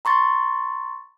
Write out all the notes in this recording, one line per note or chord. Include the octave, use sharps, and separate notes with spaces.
A#5 C6 C#6 A6